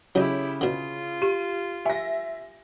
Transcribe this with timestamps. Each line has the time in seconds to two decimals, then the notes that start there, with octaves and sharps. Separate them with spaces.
0.15 C#3 F#3 E4 G4 C#5 D#5
0.61 B2 D3 F4
1.22 G4 D#7
1.86 E5 G#5 A#6